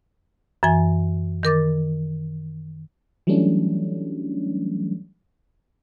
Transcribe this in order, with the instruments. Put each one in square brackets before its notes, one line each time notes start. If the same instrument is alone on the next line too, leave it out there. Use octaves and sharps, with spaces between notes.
[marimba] F#2 E3 G#5
D#3 A#4 D6 A6
[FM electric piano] E3 F#3 G3 A3 C#4 D4